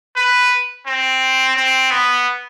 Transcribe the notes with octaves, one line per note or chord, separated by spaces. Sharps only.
B4
C4
C4
B3